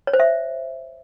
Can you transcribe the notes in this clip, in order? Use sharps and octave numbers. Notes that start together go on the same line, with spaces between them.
C#5
C5
E5